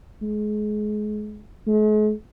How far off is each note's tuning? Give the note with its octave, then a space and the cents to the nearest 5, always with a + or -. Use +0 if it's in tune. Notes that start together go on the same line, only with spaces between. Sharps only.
G#3 +30
G#3 +45